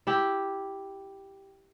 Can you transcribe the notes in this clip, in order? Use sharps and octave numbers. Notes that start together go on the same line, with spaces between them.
E4 G4